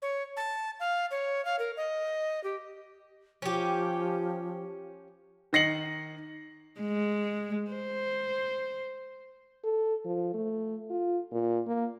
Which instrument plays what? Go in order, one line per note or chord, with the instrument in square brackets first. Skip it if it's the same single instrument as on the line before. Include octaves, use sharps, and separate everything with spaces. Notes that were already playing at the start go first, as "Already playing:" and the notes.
[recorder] C#5
A5
F5
C#5
F5
A#4
D#5
G4
[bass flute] F3 [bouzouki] C#4 G4
[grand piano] D#3 D#5 A#6 C7 C#7 F#7
[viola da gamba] G#3
C5
[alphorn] A4
F3
A3
F4
A#2
A#3